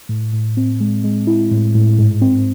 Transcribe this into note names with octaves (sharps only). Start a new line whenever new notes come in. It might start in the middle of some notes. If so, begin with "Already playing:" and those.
A2
A2
C4
G#3
G#3
E4
A2
A2
G#2
C4